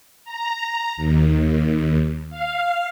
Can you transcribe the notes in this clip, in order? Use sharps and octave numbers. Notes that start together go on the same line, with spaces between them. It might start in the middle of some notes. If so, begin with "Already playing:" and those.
A#5
D#2
F5